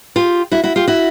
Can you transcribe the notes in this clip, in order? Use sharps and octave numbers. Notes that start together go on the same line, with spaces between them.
F4 G4
E4 F#4
E4 F#4
F4 G4
E4 F#4